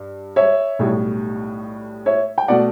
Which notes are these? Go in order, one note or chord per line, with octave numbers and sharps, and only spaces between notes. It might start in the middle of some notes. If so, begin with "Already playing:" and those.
Already playing: G2
C#5 E5
B1 A2 G3
C#5 E5
G5
B2 A3 D5 F#5